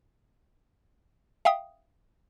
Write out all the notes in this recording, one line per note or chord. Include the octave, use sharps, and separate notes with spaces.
E5 F5 G5 D#6